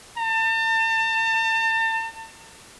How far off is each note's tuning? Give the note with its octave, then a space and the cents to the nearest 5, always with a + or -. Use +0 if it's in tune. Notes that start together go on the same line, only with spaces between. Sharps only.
A5 +40